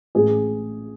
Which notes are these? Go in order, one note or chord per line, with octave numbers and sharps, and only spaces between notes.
A1 G#4